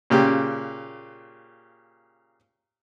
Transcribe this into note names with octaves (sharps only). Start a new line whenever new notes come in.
A#2 C#3 G4